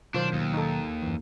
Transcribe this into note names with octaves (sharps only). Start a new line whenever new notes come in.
B2 D#3 F#3 D4 F4 C5
D#2
D#4 A4
F#2 E3